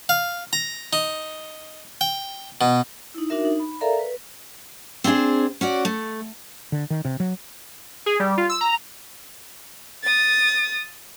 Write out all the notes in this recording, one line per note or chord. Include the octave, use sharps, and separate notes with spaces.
F5
A#5
D#4
G5
B2
D#4 E4
D4 D#4 F#4 A#4 E5
D#4
B5
A4 A#4 D5 E5 F5 A#5
B4
C4 D4 E4 G#4 C5
C#4 F#4 D5
A3
D3
D#3
C3
F#3
G#4
G3
F4
E6
A#5
D#6 A6